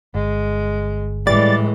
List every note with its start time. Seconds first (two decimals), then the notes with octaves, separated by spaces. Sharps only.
0.15 G1 G#3
1.27 A2 E3 G3 G#3 D5 A6